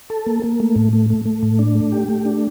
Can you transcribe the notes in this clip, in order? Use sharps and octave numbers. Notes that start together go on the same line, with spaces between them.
A4
A#3
A#3
A3
A2
A3
A3
A3
A2
D4
A3
G4
A3
D4